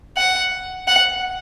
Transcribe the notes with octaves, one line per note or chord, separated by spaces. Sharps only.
F#5
F#5